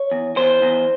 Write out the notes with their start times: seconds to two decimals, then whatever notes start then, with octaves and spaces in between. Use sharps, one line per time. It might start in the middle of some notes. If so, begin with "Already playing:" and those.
Already playing: C#5
0.11 E2
0.36 E2 C5
0.62 E2